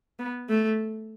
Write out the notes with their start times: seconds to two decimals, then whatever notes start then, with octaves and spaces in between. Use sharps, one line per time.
0.19 B3
0.49 A3